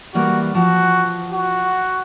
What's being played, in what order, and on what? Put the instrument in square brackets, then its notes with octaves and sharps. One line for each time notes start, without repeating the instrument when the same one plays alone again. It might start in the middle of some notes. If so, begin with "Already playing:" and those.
[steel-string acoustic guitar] E3 G3 A#3 [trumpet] F#4
[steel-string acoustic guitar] F3 [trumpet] F#4
[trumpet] F#4